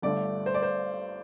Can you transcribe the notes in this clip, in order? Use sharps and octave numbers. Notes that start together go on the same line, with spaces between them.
G1 G2 D3 A3 D5
C5
D5
C5